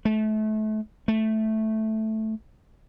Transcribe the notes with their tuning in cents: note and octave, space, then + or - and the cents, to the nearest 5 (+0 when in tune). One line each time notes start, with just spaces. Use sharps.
A3 -30
A3 -5